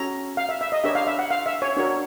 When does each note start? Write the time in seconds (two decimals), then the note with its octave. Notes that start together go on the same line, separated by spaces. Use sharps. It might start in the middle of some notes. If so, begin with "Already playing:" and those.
Already playing: C#4 F#4 A4 C#5 A#5
0.37 F5
0.49 E5
0.61 E5
0.72 D#5
0.84 D4 G4 A#4 C#5 E5
0.95 F5
1.07 E5
1.19 F#5
1.31 F5
1.46 E5
1.62 C#5
1.77 D4 F#4 A#4 C#5